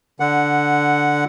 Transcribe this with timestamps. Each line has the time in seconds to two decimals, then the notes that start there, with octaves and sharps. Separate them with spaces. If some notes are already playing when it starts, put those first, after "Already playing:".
0.20 D3 F#5